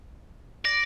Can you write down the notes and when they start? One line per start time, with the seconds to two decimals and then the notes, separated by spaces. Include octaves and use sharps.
0.65 D5 A#6